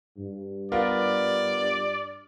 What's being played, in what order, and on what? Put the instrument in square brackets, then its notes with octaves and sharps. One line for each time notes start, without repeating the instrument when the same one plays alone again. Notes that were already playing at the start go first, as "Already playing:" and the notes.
[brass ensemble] G2
[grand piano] B3 F4 A#4 [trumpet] D5